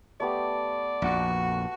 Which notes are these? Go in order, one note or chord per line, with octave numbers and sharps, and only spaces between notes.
A3 B3 G4 D5
A#1 F2 F#4